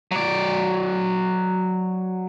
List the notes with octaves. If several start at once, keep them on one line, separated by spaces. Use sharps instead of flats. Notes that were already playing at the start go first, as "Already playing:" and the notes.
F#3 D5